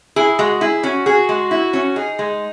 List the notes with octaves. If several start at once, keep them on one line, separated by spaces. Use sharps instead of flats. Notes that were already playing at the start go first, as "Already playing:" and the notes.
E4 G#4
G#3 F#4
E4 G#4
C#4 F#4
F#4 G#4
G#3
E4
C#4
D#4 G#4
G#3